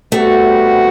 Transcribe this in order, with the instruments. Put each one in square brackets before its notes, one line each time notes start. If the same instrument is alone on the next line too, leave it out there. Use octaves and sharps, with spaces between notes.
[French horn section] C3 G3 B3 F#4 [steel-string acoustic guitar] A3